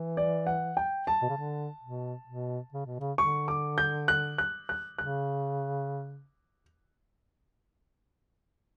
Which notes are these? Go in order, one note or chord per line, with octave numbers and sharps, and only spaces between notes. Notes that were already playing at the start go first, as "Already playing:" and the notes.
Already playing: E3
D5
F#5
G5
A5
B2
C#3
D3
B2
B2
C#3
B2
C#3
D3 C#6
D6
G6
F#6
F#6
F#6
C#3 F#6